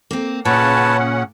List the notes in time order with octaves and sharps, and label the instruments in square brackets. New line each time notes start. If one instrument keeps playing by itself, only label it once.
[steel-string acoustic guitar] A#3 C4
[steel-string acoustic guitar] A#2 [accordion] C#3 C#4 F#5 [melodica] B4 C#5 A5